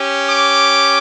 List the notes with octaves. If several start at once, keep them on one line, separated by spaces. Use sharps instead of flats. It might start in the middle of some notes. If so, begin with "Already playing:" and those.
Already playing: C#4 G4
D6